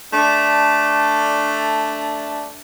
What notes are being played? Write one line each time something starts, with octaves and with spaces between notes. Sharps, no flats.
A3 D4